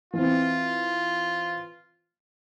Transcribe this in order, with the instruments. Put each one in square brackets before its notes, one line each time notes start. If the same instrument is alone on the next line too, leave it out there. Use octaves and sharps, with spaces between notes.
[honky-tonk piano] E3 C4 [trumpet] F4